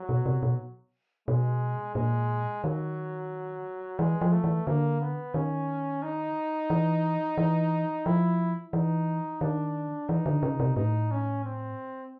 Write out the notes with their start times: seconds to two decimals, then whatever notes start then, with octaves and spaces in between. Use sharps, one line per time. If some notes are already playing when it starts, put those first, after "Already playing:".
Already playing: F#3
0.09 B2
0.26 C3
0.43 B2
1.28 B2 G#3
1.95 A#2 G#3
2.64 D#3 F#3
3.99 E3 G#3
4.21 F3
4.32 A3
4.44 E3
4.66 D3 A#3
5.01 B3
5.34 D#3 C#4
6.03 D#4
6.70 E3
7.38 E3
8.06 F3 E4
8.73 E3 D#4
9.41 D#3 D4
10.09 E3 D#4
10.26 D3
10.43 C#3
10.60 C3
10.77 A2 D#4
11.11 C#4
11.44 C4